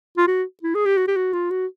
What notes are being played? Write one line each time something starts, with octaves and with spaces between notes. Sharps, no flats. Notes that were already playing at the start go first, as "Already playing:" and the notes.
F4
F#4
E4
G#4
G4
F#4
G4
F#4
F4
F#4